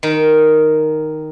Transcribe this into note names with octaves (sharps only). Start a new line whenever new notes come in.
D#3